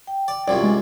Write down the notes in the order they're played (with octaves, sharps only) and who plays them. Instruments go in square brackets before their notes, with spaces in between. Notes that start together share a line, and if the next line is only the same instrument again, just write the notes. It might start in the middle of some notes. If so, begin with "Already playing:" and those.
[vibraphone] G5
[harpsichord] D5
[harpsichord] C2 F#2 A#2 [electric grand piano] D5
[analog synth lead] G#3